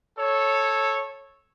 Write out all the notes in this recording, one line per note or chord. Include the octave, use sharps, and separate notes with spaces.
A4 C#5